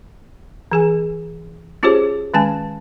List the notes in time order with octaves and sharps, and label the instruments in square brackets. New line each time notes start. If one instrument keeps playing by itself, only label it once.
[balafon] E3 G#4 G#5
C#4 F4 G4 G#4 C5 C#5
D#3 G#3 C#4 G#5 A5